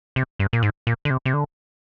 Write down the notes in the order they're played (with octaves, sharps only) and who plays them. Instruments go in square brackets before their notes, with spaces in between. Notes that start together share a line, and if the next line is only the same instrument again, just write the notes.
[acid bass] C3
G2
A#2
G#2
A#2
D3
C3
C3
D3